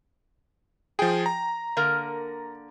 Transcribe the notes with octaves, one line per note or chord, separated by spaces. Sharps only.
F3 G#4 G5
A#5
D3 A#3 A#4